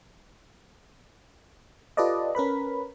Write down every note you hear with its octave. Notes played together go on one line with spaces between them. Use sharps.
F4 G4 A4 B4 D5 D#5
C#4 A#4 B4 B5